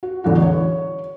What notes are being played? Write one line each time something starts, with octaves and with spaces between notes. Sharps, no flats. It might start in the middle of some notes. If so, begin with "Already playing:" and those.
F#4
A1 E2 D3 F#4
C#5